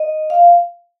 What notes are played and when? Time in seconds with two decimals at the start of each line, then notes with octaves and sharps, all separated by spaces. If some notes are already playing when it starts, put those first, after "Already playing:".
Already playing: D#5
0.30 F5